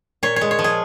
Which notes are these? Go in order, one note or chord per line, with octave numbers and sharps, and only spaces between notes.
A#2 C#5
C#5
G#3
C#5
F3
G#4